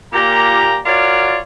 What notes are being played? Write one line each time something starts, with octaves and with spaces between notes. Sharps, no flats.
A#2 G4 A#5
F4 F#4 A#4 C#5 D5